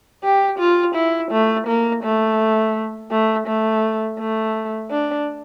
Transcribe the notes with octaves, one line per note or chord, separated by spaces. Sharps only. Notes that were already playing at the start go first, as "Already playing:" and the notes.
G4
F4
E4
A3
A#3
A3
A3
A3
A3
D4